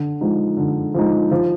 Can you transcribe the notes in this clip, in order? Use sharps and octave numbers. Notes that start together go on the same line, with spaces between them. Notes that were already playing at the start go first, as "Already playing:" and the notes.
Already playing: D3
F3 G#3 D#4
D3
F3 G#3 D#4
F3